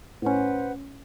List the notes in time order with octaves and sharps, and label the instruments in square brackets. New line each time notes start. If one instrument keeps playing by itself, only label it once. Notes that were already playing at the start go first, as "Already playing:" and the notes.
[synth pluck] A2 C#4 [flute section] B4 C5 F#5